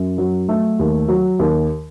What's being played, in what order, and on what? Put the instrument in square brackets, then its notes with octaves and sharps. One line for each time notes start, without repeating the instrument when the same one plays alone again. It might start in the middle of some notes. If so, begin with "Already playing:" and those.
Already playing: [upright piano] F#2
F#3
A3
D#2
F#3
D#2